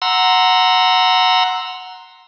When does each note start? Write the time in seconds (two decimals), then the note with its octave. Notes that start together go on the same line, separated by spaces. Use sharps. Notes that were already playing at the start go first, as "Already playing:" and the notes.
0.02 F#5 A#5 C6 E6